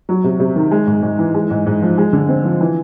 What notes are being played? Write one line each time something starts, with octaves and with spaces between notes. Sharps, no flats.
F#3
C3
C3
D#3
G#3
G#2
G#2
E3
G#3
G#2
G#2
F3
G#3
D3
C4
F3
E3